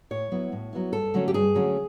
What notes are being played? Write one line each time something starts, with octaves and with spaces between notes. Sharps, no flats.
A2 C#5
F#3 B3 E4
A2
F#3 B3 E4
G2 A4
D3 F#3 A3 C#4
G4
G2 G#4
D3 F#3 A3 C#4